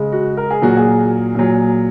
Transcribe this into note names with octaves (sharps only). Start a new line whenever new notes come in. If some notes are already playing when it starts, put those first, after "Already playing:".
Already playing: C#3 G#3
F#4
A#4
G#4
A#2 F#3 F#4
G#4
A#2 F#3